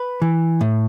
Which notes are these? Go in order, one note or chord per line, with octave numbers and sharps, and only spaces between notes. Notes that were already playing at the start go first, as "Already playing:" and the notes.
Already playing: B4
E3
A2